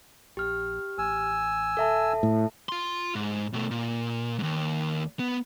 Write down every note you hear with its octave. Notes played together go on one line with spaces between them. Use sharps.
A#1 G4 F6
A1 G#5 E6
D#1 A4 E5 A5
A2
F4 C6
G#2
B2 A3
A#2
D#2 G#2
B3